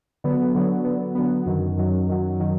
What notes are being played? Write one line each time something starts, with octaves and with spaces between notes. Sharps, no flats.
D3 F#3 B3
D3 F#3 B3
D3 F#3 B3
D3 F#3 B3
F#2 D#3 F#3
F#2 D#3 F#3
F#2 D#3 F#3
D#3 F#3